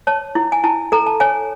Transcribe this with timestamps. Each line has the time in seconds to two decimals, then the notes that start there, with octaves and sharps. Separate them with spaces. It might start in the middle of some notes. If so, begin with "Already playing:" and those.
0.07 C#5 A5
0.35 E4
0.52 G#5
0.64 E4 A5
0.92 A4 A#5
1.07 A5
1.20 C#5 G#5